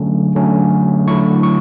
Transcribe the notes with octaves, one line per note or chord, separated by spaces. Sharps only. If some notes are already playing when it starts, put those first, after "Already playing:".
Already playing: D3 F#3 A3 C#4
D3 F#3 A3 C#4
D3 F#3 A3 E4 C#6
C#6